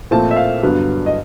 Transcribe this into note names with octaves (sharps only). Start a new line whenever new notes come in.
A#2 F3 A3 C4 A5
E5
F5
G2 D3 F#3 B3
D#5